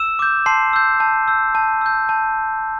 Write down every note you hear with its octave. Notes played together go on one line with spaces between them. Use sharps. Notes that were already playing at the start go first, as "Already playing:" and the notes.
Already playing: E6 E7
D6 G6
A5 C6 C7
E6 G6
A5
E6 G6
A5
E6 G6
A5